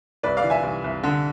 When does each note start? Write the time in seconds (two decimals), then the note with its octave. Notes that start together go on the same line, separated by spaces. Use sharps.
0.23 C2 B4 D5
0.37 D5 F5
0.44 E3
0.50 E5 G#5
0.63 C2
0.84 C2
1.03 D3